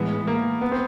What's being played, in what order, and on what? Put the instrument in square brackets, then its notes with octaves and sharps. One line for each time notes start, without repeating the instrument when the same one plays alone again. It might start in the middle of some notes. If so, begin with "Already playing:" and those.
Already playing: [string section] A2 E3 G#3 [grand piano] B3
[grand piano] A#3
B3
C4